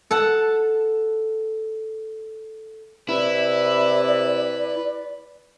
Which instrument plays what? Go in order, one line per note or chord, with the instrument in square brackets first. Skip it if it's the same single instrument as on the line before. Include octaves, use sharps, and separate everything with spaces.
[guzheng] A4 F#5 A5
[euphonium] C3 [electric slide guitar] E4 [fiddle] B4 [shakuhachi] D5